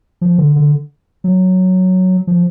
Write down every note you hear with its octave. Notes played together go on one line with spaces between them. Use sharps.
F3
D3
D3
F#3
F3